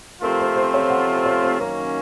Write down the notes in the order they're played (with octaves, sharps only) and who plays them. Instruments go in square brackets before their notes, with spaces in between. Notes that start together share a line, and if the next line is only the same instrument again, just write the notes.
[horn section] C3 F3 A3 C4 F4 [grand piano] A#4
[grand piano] C5
C5
C#5
F#5
C#5
C5
[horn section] F#2 D#3 A#3 C#4 [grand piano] A#4